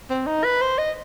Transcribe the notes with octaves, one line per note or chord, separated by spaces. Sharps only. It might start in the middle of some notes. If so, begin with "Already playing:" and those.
C4
D#4
B4
C5
D#5